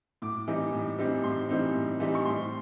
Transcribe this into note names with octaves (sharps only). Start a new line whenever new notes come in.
A2 D6
E3 G3 C4 D#4
A2
E3 G3 C4 D#4
A2 C6
E3 G3 C4 D#4
A2
E3 G3 C4 D#4
C#6
A2 C6